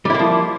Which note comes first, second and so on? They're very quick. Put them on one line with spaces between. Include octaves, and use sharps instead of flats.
G3 E4 A#3 F3